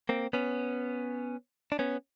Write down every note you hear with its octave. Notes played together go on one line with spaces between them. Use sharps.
A#3 C4
B3 C#4
D4
B3 C#4